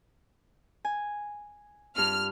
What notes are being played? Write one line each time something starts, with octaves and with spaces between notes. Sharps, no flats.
G#5
G2 F4 F6